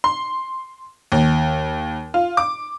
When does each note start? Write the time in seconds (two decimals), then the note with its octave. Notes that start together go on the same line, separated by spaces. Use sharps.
0.04 C6
1.12 D#2
2.14 F4
2.37 D6